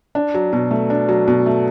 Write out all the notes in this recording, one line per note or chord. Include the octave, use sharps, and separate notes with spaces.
D4
F#3
B2
A3
D4
F#3
B2
A3